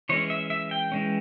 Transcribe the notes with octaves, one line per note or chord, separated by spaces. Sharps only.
E3 G#3 C#4 C#5
E5
E5
G5
E3 G#3 C#4